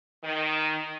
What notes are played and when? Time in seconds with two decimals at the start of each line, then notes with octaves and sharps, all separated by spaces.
0.23 D#3